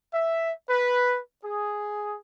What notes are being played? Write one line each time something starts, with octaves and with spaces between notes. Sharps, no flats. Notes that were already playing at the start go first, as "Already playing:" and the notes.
E5
B4
G#4